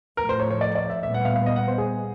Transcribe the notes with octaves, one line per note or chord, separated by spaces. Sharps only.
A2 F3 A3 A#4
C5
C#5
C#5
D5
D5
E5
A#2 G3 B3 E5
F#5
F5
F5
D#5
F#5
C5
G#4